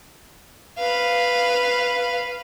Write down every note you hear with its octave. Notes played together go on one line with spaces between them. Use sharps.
B4 F5